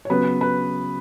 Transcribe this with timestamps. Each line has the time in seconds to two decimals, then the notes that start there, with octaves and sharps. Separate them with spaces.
0.05 C#5
0.10 C#3 F#3 B3 B4
0.41 B4